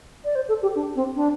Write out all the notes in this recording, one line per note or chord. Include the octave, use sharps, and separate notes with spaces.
D5
C5
A4
G4
D4
C4
D4